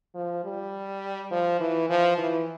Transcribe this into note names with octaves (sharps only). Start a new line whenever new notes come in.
F3
G3
F3
E3
F3
E3